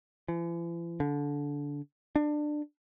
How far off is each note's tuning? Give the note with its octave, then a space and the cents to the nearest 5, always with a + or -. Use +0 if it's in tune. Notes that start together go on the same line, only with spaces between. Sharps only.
E3 +45
D3 -20
D4 +20